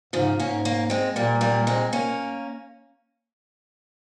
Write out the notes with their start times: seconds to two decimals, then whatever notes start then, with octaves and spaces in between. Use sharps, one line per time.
0.13 G#2 C#3 F3
0.39 G#2 A#3 C#4
0.65 A#3 C#4
0.90 G#3 C4
1.15 A#2 G3 A#3
1.41 G3 A#3
1.67 G#3 C4
1.93 A#3 C#4